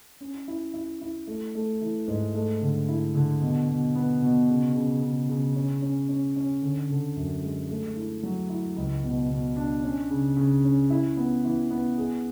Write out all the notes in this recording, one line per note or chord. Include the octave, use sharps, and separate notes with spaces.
C#4
E4
E4
E4
A3
A3
E3
G#2
A3
D3
E4
D3
B2
B2
B3
B2
C#3
C#3
C#3
C#3
C#4
C#4
C#4
C#4
D3
D3
F#2
G#3
A3
E4
F#3
E4
C#2
B2
B2
D4
C#4
C#3
C#3
C#4
E4
B3
E3
B3
G#4